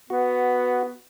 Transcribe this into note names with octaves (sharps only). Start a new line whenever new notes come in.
B3 F#4